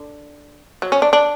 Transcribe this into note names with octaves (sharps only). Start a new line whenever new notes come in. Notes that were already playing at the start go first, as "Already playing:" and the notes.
Already playing: D3
F#3
C#4
D4
D4